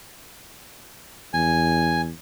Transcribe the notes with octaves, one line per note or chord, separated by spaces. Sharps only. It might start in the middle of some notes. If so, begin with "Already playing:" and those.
E2 G#5